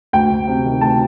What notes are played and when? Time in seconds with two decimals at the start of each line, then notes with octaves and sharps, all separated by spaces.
0.13 D2 G5
0.31 D2
0.47 C3
0.65 D#3
0.81 D2 A5